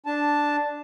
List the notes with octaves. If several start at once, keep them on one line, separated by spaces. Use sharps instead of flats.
D4 A5